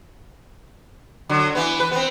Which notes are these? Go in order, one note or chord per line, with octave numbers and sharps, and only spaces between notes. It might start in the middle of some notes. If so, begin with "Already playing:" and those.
D3 F#3
E3 B3
B4
B3 C4